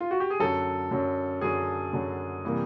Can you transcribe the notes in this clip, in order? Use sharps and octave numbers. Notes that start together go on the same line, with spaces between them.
F4
F#4
G4
G#4
F#2 D3 F#3 A4
F#2 D3 F#3
F#2 D3 F#3 G#4
F#2 D3 F#3
C3 E3 G3 A#3